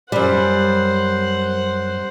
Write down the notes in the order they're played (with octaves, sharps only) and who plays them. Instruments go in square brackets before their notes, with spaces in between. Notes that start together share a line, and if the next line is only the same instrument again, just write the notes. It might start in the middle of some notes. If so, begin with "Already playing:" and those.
[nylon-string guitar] F#2 G3 [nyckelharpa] C5 F#5